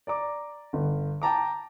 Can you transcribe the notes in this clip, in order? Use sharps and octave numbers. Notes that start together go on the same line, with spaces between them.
D5 A#5 D6
G1
G5 A5 A#5 D6